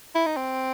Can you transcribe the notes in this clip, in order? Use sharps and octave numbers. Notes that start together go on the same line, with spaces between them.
E4
D#4
C4